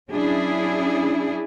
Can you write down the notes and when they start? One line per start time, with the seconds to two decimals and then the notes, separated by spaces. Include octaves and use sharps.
0.10 F#3 C#4 D4 E4 G#4